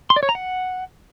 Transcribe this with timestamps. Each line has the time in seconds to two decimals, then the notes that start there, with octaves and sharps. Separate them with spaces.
0.10 C6
0.16 D5
0.23 C#5
0.29 A#5
0.35 F#5